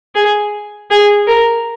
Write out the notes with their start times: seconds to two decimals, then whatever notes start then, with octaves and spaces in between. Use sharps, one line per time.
0.15 G#4
0.91 G#4
1.27 A#4